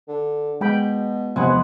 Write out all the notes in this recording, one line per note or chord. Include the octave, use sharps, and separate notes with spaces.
D3
B2 G#3 G5 B5
E2 C3 F3 G#3 B3 F#5 G#5